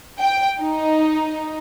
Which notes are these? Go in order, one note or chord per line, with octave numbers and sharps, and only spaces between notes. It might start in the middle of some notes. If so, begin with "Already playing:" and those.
G5
D#4